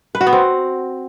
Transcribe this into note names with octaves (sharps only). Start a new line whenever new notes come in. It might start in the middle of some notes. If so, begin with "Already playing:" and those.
B4
F#4
B3
C4